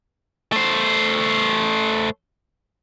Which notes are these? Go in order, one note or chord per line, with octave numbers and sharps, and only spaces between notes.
A3 C5